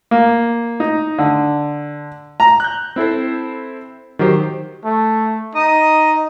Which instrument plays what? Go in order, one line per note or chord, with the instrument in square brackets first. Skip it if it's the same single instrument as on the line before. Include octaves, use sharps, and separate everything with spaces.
[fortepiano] A#3
D#4
D3
A#5
[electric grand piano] F#6 G6
C4 E4 A4 C5
D#3 F#3 G4 C5
[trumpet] A3
[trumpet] D#4 [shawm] D#5